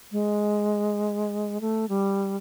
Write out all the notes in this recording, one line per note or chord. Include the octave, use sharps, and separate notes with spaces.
G#3
A3
G3